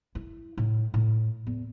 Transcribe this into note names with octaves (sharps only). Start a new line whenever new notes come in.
E4
A2
A2
E2